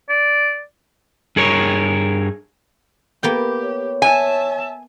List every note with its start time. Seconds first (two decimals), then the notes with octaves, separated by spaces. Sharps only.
0.09 D5
1.36 G2 G#4 A#4 C#5
3.23 A#3 B3 G4 G5
3.63 C#5
4.02 E5 G#5 A5